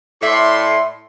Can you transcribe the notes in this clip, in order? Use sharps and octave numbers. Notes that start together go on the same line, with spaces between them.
A2 D5 E5 C6